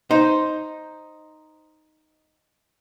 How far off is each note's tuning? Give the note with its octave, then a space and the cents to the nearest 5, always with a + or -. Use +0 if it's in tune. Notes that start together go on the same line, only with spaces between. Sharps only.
D#4 +0 C5 +0